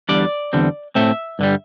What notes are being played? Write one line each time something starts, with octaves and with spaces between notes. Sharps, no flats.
E2 D3 G3 D4 D5
E2 D3 G3 C4
A2 A3 C4 E5
G2 D3 G3